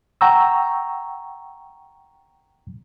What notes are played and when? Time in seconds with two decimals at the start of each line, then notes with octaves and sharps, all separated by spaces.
0.21 F#5 G5 A#5 C#6 E6